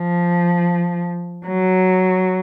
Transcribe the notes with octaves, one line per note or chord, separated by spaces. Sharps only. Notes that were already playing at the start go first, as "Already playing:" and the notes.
Already playing: F3
F#3